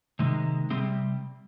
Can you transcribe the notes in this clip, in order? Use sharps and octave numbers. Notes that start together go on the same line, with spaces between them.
C3 D#3 G#3
C3 G3 G#3 C4